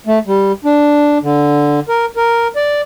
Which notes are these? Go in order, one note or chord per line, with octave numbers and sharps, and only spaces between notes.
A3
G3
D4
D3
A#4
A#4
D5